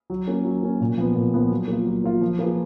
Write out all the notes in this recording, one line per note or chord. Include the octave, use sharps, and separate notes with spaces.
F#3
A#3 C#4
F#3
A#3 C#4
A#2
F3 B3
A#2
F3 B3
F#3
A#3 F4
F#3
A#3 F4
F3
A#3 F4 G#4 B4